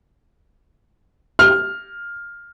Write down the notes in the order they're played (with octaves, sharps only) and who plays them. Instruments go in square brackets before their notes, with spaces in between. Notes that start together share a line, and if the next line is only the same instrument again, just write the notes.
[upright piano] F6